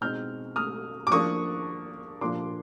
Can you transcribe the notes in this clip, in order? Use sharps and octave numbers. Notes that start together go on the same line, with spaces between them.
B2 G#3 C4 D#4 F6 G6
D#6 F6
D6
F3 A#3 D4 C#6 D#6
A#2 F3 A#3 D4 C6 D6